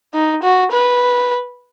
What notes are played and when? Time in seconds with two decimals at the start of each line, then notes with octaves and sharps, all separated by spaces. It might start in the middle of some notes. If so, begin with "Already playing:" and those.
0.14 D#4
0.43 F#4
0.72 B4